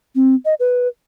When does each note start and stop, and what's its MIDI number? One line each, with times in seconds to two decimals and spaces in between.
0.15 0.35 60
0.45 0.54 75
0.60 0.88 71